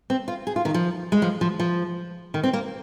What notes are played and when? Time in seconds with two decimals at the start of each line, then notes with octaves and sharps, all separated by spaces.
0.10 C4
0.28 F4
0.47 G#4
0.56 F4
0.65 D#3
0.74 F3
1.12 G#3
1.22 F3
1.41 F3
1.60 F3
2.34 D#3
2.43 C4
2.53 A#3